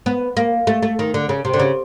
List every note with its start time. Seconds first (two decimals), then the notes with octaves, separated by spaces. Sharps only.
0.06 B3
0.37 A#3
0.67 A3
0.83 A3
0.99 D#3
1.14 D3
1.29 C#3
1.45 C3
1.54 D3
1.59 C#3